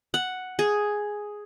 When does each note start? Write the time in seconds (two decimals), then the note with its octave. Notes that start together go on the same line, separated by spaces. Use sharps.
0.14 F#5
0.59 G#4